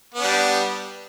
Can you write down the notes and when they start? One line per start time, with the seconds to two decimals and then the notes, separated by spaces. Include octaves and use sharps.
0.14 B3
0.19 D4
0.24 G3